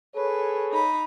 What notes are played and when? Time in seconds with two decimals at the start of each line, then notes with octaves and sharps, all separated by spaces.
0.15 G#4 A4 B4 C#5
0.71 D#4 B5